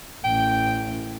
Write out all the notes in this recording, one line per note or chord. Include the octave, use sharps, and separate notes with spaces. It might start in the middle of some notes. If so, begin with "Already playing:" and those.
A1 G5